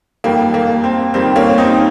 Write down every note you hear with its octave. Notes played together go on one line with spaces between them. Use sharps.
F2 D#3 G3 A#3
A#3
C4
F2 D#3 G3 C4
A#3 C#4
C4 D#4